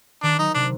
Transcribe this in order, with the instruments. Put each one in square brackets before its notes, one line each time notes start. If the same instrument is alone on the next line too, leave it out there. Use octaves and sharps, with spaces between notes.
[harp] D#3 [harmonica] D4
[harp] F#3 [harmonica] D#4
[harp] C3 [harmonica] D4